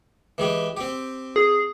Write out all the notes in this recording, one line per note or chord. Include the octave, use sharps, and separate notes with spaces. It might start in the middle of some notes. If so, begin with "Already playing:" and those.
E3 G#3 G4
C4 G4
G#4